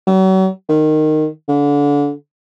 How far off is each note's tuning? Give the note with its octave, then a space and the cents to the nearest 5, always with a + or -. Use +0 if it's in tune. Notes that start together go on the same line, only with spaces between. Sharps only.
F#3 +40
D#3 -15
D3 -30